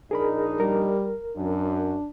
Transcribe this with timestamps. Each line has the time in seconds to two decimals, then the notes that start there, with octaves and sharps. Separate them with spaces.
0.11 A#1 D4 D#4 G#4 A#4 B5
0.60 G3 A#4
1.36 F#2 D4